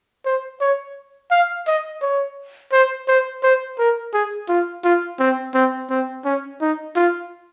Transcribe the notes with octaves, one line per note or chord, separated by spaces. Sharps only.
C5
C#5
F5
D#5
C#5
C5
C5
C5
A#4
G#4
F4
F4
C4
C4
C4
C#4
D#4
F4